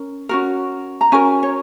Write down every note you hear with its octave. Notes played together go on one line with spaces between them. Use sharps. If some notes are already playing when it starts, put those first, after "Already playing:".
Already playing: C#4 A#4
C#4 F#4 A#4
A#5
C#4 F#4 A#4 G#5
C#5